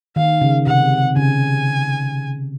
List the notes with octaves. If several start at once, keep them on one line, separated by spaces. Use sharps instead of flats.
D#3 F5
C#3
C3 F#5
C#3 G#5